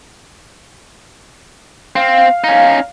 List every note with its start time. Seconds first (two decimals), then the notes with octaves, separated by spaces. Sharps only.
1.96 C4 F5
2.44 C#4 D#4